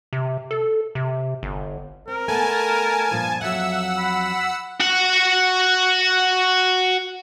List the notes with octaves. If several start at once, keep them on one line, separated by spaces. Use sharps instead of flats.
C3
A4
C3
G1
C4 A#4
A3 B3 G#5 A5
G2 A#2 F3
F2 F#3 E5 F#5 E6
B5
F#4 F#5